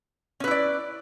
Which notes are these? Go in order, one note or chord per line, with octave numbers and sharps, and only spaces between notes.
C#4 E4 B4 D5